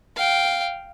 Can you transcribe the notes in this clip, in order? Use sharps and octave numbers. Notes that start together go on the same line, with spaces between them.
F5 G5